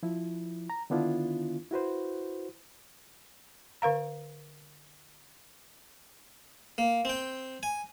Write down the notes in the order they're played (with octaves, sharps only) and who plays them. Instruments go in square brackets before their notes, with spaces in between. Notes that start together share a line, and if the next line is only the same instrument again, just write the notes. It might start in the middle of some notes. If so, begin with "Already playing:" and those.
[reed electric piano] F3 E4
A#5
D3 D#3 B3 D4 E4 F4
E4 F#4 B4 C5
[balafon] D3 A#4 F5 A#5
[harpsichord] A#3
C4 G5
G#5